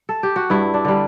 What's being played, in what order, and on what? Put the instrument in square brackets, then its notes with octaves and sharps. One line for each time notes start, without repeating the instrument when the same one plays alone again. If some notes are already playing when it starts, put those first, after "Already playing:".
Already playing: [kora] B4
A4
G4
F#4
G2 E4
D4
D3 G3